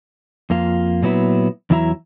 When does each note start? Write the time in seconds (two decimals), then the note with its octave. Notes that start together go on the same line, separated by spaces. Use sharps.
0.50 F2 A#3 F4
1.03 A#2 F#3 B3 E4
1.70 E2 E3 F#3 E4 E5 A#5